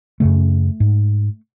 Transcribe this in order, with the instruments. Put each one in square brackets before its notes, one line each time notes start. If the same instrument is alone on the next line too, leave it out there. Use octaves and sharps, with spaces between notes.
[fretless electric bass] F#2 C#3 A3
G#2